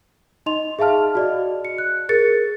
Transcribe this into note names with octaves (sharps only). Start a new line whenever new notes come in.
D#4 D#5 C6 F7
G#4 E5 F5 A5 F6
F#4 D5 D#5
C#7
F#6
G#4 A#4 A6 C#7